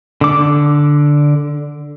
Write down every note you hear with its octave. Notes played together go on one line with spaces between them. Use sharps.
D3 D6